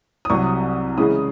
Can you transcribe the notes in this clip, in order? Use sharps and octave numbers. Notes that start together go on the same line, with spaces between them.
D#6
C2 C3 F#3 C#6
C#3 E3 G#3 C#4 E4 D#6